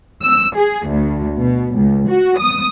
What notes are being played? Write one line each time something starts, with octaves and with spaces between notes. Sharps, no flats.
E6
G#4
D2
B2
C#2
F#4
D#6